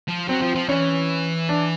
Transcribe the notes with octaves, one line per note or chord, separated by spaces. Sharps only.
F3
F#3 C4
F3
F3
E3 C#4
D4